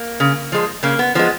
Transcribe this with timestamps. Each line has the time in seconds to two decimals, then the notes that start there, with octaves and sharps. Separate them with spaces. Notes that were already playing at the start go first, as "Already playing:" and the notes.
Already playing: A#3
0.20 C#3
0.52 F3 G#3
0.83 C#3 A#3
0.99 B3
1.15 F3 G#3 B3